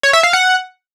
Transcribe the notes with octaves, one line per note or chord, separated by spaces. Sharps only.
C#5
E5
F5
F#5